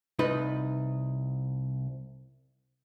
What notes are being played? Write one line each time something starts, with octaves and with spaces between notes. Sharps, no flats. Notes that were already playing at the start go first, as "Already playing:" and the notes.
C2 D#4 B4